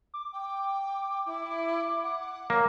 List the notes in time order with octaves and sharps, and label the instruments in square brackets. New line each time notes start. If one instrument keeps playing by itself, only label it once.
[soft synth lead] D6
[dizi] G5
E4
F#5
[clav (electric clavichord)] A#3 [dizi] C#5